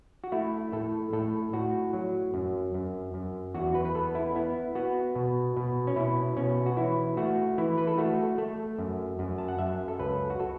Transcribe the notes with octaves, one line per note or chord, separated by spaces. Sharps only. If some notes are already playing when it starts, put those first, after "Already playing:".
F#4
A3 E4
A2 A4
A2 A4
A2 F#4
F#3
F#2
F#2
F#2
E2 F#4
B4
B4
B3 A4
E4
B3 E4
B3 F#4
B2
B2
C#4
B2 E4
B2 C#4
F#4
E3 E4
A3 F#4
E3 E4
B4
A4
A3 F#4
A3 A4
F#2
F#2
A5
F#5
F#2 E5
A4
C#2 B4
F#4
A4